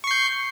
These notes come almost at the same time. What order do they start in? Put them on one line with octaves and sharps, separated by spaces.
C#6 C7 G6